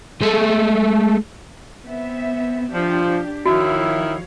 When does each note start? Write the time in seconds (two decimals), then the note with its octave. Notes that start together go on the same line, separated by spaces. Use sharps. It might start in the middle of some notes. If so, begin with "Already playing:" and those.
0.22 G#3 A3
1.84 B3 C4 E5
2.72 F3 D4 G4
3.46 D#3 F3 E4 F#4 C#5 F5